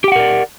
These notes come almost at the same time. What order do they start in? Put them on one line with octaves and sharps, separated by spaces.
G4 G5 F#5 A#4 D5